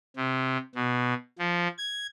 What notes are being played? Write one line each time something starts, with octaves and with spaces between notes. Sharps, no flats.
C3
B2
F3
G#6